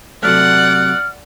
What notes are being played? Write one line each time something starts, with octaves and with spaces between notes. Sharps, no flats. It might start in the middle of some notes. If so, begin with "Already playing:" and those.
C3 F#3 A3 D5 F#5 F6 F#6